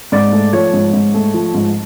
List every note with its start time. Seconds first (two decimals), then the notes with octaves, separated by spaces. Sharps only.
0.12 G#2 D5
0.33 A3
0.53 F3 C#5
0.73 G#2
0.93 G#2
1.14 A3
1.34 F3
1.54 G#2